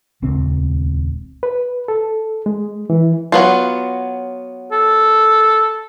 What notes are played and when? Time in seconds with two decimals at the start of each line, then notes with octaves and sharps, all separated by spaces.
0.22 D#1 C#2 C4
1.43 B4
1.88 A4
2.46 G#3
2.90 E3
3.32 F#3 B3 F4
4.72 A4